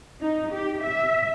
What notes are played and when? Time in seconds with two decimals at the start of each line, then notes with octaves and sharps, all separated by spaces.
0.20 D#4
0.52 G4
0.81 E5